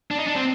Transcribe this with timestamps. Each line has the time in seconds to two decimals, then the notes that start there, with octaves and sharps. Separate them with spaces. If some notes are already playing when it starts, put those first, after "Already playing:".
0.11 D4
0.19 D#4
0.27 D4
0.35 C4